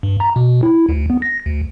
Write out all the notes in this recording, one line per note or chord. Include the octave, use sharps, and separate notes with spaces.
G2
A#5
B2
E4
D2
B3
A#6
D2